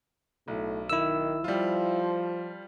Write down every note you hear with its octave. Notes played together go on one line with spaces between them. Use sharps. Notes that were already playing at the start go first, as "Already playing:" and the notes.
B1 A2
D#3 E4 E6
F3 G3 F4